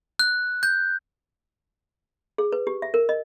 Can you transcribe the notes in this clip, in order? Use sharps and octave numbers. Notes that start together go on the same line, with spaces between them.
F#6
G6
G#4
B4
G4
E5
A#4
D#5